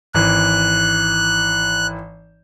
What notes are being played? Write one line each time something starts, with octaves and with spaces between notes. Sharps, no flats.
G#1 E3 F#6